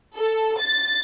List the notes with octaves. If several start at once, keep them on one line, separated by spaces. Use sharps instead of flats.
A4
A6